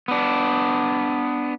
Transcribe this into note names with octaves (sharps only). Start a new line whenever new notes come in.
B3 D4